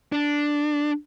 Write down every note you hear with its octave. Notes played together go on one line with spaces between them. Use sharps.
D4